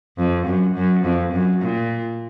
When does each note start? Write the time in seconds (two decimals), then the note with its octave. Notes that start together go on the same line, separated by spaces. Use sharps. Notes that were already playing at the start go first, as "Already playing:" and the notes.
0.18 F2
0.47 F#2
0.76 F#2
1.04 F2
1.33 F#2
1.61 A#2